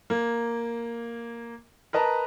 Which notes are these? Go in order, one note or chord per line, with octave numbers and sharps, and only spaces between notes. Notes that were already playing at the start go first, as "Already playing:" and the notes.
A#3
A#4 B4 D#5 A5 A#5